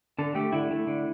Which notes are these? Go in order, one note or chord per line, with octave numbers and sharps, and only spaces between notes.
D3 A4
A3 G4
D3 E4
A3
D3